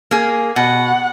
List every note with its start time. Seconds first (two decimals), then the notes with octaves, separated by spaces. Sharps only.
0.11 A#3 G#4
0.56 B2 F#5